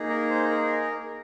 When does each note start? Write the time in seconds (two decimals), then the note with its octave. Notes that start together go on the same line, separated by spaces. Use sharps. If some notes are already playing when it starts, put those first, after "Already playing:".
Already playing: A#3 D#4 G#4
0.09 A#4
0.30 C5
0.51 A#4